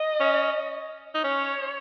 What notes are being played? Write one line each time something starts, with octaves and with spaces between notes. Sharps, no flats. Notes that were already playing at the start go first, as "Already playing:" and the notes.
Already playing: D#5
C#4
D#4
C#4 C#5